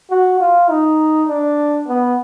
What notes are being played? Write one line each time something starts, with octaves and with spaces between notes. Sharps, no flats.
F#4
F4
D#4
D4
B3